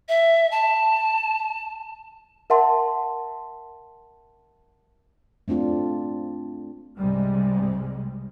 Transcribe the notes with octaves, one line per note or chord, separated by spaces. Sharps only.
E5
A5
A#4 E5 F#5 A5 C6
A3 C4 D4 F4
C2 G2 C3 G3 G#3